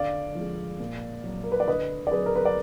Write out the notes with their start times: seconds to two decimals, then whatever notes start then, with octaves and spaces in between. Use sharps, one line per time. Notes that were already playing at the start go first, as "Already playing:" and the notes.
Already playing: D3 D5 F5
0.35 F3 G#3
0.80 A#2
1.24 F#3
1.44 A#4
1.52 B4
1.60 D5
1.68 D3 B4 D#5
2.07 D5
2.11 F#3 G#4 B4
2.26 A#4
2.36 B4
2.45 D5